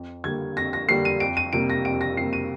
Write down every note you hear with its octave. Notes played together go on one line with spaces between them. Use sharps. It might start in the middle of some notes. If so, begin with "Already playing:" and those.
Already playing: F2
D3 G3 A#3 G#6
F2 A#6
A#6
D3 G3 A#3 C7
D#7
F2 D7
D#7
C3 G3 A#3 D7
A#6
F2 D7
A#6
C3 G3 A#3 C7
D#7